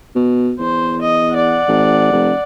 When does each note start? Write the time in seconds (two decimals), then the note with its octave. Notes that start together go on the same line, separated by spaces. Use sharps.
0.16 B2
0.60 E2 C5
1.02 D#5
1.34 D5 F#5
1.68 G#1
2.12 F1